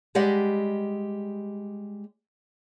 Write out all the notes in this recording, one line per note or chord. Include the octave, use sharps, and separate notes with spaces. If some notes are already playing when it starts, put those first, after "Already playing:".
G3 G#3 G4 D5 D#5 F#5